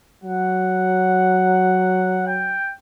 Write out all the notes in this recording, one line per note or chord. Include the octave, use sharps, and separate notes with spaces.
F#3 F#5
G5